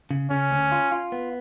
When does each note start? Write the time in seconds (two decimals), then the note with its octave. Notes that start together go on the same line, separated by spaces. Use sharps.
0.11 C#3
0.30 C#3 C#4
0.51 D2
0.72 F4
0.92 F4
1.12 B3